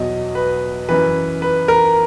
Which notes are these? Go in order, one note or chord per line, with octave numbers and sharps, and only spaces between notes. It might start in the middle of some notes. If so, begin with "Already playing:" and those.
Already playing: E2 B2 F#3 D#5
B4
F#2 E3 B4
B4
A#4